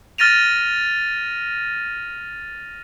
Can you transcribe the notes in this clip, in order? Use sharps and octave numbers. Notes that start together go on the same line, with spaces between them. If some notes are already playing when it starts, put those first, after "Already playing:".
F6 A6 A#6 D#7 F7